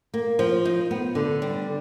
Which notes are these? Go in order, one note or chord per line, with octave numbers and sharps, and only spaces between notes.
A#3
F3
D#4
B3
D3
G3